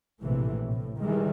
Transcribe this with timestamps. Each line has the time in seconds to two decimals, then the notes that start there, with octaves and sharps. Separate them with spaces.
0.23 A#1 A2 C3 E3
0.67 A2
1.00 D#3 E3 G3 G#3